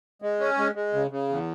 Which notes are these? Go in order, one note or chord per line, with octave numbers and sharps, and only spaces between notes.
G#3
C#4
G#3
G#3
C#3
C#3
E2